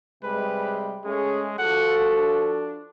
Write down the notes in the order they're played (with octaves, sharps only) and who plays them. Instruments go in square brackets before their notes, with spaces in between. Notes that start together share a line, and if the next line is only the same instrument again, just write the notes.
[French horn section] C3 G3 G#3 [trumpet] B4
[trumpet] G#3 [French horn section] A3 C#4 G#4
[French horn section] F3 F#4 A4 [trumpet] F#5
[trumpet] D4